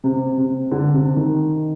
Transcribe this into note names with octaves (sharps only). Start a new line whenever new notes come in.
C3
C3
D3
C3
D#3